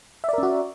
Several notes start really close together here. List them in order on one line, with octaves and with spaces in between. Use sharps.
E5 D5 A#4 C#4 F#4